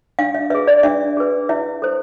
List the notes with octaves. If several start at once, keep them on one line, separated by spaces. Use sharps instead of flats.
D4 F5
E5
G#4 B4 E5
D5
D4 E5
G#4 B4
E4 E5
A4 C5